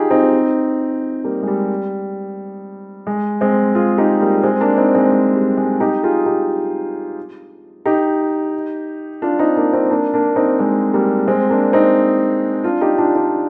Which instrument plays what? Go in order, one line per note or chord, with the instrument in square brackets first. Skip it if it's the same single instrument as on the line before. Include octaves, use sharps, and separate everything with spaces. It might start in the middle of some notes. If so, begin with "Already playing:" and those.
Already playing: [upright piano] D#4 F4 G4 G#4
C4 D#4
G3 A#3
G#3
G3
G#3
G#3 C4
F4 G#4
D#4 G4
G3 A#3
G#3 C4
A#3 D4
C4 D#4
G#3 C4
G#3
G3
G#3
D#4 G4
F4 G#4
D#4 G4
D#4 G4
D4 F4
C4 D#4
A#3 D4
C4 D#4
A#3 D4
A#3 D4
C4 D#4
G#3 C4
G3 A#3
G#3 C4
A#3 D4
C4 D#4
D4 F4
D#4 G4
D4 F4
D4 F4